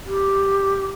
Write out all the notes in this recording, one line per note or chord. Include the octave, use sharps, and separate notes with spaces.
G4